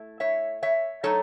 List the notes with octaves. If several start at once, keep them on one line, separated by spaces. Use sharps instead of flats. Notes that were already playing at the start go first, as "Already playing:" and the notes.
Already playing: A3 E4
C#5 E5
C#5 E5
F#3 A3 D#4 A4 C#5